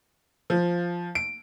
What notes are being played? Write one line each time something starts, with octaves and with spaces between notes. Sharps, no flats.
F3
D7